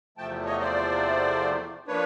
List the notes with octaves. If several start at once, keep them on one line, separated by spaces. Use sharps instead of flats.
E2 C3 F3 A3 G5 A5
C#5 D#5
C5 D5
F3 A#3 D4 B4 C#5